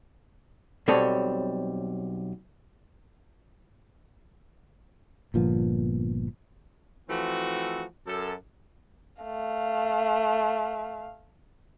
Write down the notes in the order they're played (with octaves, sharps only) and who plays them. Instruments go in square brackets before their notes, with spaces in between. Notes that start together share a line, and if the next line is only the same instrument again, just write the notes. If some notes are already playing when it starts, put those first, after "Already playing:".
[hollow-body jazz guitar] B1 G3 C4 A4 C#5 D#5
[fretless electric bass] G1 A#2 F3 B3
[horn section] E3 F3 A3 C4 F#4
F#2 A4
[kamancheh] A3 F5